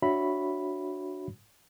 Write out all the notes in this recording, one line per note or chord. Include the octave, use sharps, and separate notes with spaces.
D4 F#4 C#5 E5 B5